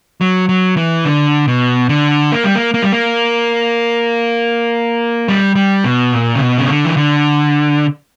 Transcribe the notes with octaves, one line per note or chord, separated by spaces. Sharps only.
F#3
F#3
E3
D3
B2
D3
A#3
G3
A#3
A#3
G3
A#3
G3
G3
B2
A#2
C#3
B2
C#3
D3
E3
D3